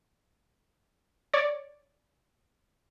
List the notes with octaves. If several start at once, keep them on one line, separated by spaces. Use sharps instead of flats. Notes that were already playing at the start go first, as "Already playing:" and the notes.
C#5 D5